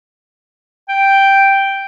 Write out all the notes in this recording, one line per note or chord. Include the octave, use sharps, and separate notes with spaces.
G5